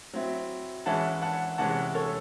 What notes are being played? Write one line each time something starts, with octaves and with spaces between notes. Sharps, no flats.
F#3 C4 E4
E3 G#3 C#4 E4 F#5 A5
F#5 A5
C3 E3 G#3 C#4 F#5 A5
A4 C#5